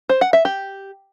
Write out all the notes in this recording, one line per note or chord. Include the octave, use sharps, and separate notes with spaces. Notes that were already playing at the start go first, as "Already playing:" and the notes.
C5
F#5
E5
G4